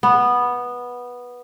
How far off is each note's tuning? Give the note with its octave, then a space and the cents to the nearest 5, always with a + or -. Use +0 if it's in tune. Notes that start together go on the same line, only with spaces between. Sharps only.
B3 -10